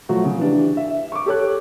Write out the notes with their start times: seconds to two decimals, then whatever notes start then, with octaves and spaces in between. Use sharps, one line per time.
0.09 F3 F#3 A3 F#4
0.25 C#3
0.39 E3 D4 G4
0.77 E5
1.12 C#6 D6
1.26 G4 A4 C#5 F#6